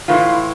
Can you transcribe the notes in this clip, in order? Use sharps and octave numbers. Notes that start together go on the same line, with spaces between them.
A2 E3 F4